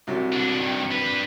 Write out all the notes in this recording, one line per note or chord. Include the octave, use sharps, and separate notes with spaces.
C2 C3 F#3
B2 D4
G2 D#3
D4 B4